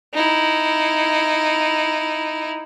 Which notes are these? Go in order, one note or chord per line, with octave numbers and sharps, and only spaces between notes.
D#4 E4